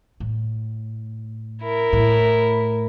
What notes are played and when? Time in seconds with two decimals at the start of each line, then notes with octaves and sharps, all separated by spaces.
0.20 A2
1.63 E4 A#4
1.93 A2